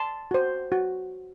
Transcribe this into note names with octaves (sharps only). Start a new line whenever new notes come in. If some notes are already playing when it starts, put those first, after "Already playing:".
Already playing: A5 C6
F#4 C5
F#4